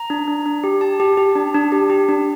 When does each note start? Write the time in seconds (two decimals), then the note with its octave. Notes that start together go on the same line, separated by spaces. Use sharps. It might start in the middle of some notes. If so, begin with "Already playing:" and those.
Already playing: A#5
0.10 D4
0.28 D4
0.46 D4
0.64 G4
0.81 G4 A5
1.00 G4
1.17 G4
1.36 D4
1.54 D4
1.72 G4
1.90 G4
2.09 D4